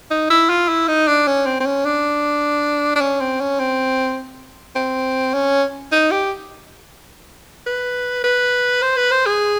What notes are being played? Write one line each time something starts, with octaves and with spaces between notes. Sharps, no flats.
D#4
E4
F4
E4
D#4
D4
C#4
C4
C4
C#4
D4
D4
C#4
C4
C#4
C4
C4
C#4
D#4
G4
B4
B4
C5
B4
C5
G#4